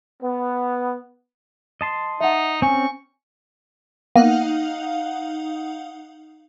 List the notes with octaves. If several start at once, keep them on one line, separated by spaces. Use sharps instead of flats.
B3
D#5 A5 C6
D#4 E5 F#5
C4 C#4 G#5 C#6
A#3 B3 D#4 F5 F#5